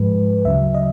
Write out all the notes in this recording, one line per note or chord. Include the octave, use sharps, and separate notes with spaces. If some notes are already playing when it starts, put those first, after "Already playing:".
Already playing: G#2 F3 G#3 B4
D2 C#3 F#3 E5
D#5